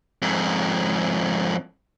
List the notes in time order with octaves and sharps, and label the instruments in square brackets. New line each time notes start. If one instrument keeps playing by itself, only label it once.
[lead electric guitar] F2 G#2